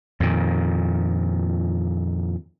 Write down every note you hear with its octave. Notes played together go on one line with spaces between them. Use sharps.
F2 A#2 D#3